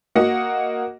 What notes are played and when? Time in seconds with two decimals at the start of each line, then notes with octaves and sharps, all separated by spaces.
0.15 A#3 F#4 D#5 F#5